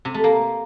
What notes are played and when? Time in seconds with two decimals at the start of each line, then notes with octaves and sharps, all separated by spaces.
0.05 C3
0.14 A3
0.24 A#3